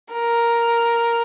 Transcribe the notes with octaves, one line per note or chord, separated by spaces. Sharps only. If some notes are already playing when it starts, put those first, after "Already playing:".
A#4